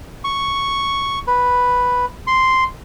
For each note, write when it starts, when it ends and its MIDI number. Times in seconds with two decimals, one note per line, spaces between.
0.24 1.19 85
1.27 2.06 71
2.27 2.64 84